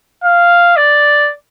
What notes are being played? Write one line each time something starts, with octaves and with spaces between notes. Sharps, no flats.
F5
D5